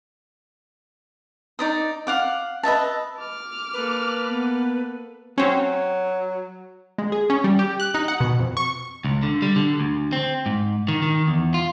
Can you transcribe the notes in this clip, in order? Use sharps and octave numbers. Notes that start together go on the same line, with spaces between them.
D#4 D5 D#6
F5 F#5 D6
B4 D#5 E5 A5
D6 F6
A#3 A4 B4
B3
F#3 C4 C#4
G#3
G#4
C#4
G3
G4
F#6
D#4
F#5
B2
F2
C#6
C#2
D3
G3
D3
D2
C4
G#2
D#3
D#3
E2
F4